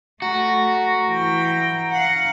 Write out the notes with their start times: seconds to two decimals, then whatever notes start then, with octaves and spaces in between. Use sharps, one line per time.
0.22 A3 F#4 A#5
1.09 E3 G5
1.42 A#5
1.92 F5 F#5